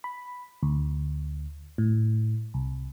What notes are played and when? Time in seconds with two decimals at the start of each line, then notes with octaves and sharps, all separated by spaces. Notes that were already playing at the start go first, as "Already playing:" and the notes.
0.04 B5
0.63 D2
1.78 A2
2.54 C2